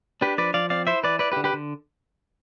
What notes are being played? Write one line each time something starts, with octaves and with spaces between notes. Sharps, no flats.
D4 G4 B4
F3 B4 D5
F3 D5 F5
C4 D5 F5
E4 C5 E5
E3 B4 D5
E4 B4 D5
G4 B4
D3
G4 B4
D3